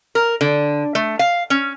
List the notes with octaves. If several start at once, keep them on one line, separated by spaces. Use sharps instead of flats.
A#4
D3
A3
F5
C#4